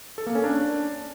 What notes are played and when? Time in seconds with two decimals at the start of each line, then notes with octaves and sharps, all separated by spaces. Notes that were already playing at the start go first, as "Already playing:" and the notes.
0.18 A4
0.27 A#3
0.35 C#4
0.44 D4